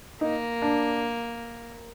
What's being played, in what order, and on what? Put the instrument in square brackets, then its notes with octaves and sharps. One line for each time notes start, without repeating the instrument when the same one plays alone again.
[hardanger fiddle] A#3 [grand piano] D#4
[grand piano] D4